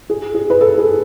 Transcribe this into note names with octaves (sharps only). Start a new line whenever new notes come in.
G#4
G#4
B4
A4
G#4